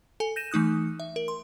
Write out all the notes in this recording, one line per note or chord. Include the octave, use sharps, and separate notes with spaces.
A4 G#5
G6 A#6 D#7 E7
E3 A3 D#4 D#6 F#6
E5
A#4
C6